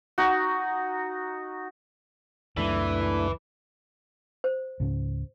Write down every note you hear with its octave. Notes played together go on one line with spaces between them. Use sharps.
D#4 F#4
C#2 F#2 E3 F#3 A3 D4 E4
C5
C#2 G#2 C#3